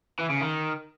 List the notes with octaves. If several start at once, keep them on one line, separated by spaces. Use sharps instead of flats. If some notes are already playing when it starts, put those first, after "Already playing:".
E3
C#3
D#3